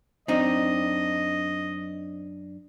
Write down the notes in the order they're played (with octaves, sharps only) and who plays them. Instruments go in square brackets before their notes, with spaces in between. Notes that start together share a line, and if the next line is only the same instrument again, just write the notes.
[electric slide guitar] F#2 D4 A#5 [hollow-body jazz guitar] C4 D#4 [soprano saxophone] D#5